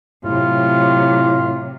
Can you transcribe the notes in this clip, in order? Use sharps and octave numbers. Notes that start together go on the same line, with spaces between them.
A2 C3 F#3 F4